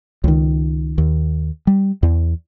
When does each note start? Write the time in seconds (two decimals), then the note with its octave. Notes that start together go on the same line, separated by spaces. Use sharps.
0.24 C#2 D#3
0.98 D#2
1.67 G3
2.03 E2